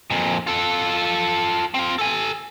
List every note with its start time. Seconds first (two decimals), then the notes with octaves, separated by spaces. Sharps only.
0.10 F2 A#2
0.47 F4 A4
1.74 C4 F4
1.99 A4 G#5